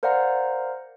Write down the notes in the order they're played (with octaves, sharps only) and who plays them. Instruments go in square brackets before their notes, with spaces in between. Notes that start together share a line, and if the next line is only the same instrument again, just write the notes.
[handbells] A#4 C5 D5 F5 F#5 A#5